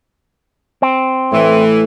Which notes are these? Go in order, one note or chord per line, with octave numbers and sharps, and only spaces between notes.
C4
A2 E3